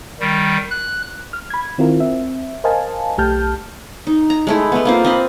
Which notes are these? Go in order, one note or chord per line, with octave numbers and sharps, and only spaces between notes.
D#3 G3
F#6
F6
B5 G#6
D#3 C4 E4 F4 A#4
C4 E5
A#4 C5 D#5 F5 G#5 A5
B1 A3 G4 A5 F6 G6
D#4
A#5
G#3 A3 E4
A3 B3
A#3 C4 F4
C4 D#5 B5